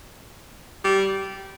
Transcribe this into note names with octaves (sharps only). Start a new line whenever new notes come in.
G3